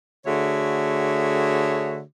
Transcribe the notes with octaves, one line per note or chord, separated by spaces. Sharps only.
D3 A3 F#4 G#4 C#5 E5